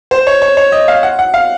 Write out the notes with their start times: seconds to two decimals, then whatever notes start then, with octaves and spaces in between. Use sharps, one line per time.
0.11 C5
0.27 C#5
0.42 C#5
0.57 C#5
0.72 D#5
0.88 F5
1.03 F#5
1.19 F#5
1.34 F5